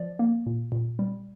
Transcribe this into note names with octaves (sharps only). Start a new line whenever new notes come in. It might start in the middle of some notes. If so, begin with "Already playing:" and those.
Already playing: F3 D5
A#3
A#2
A#2
G3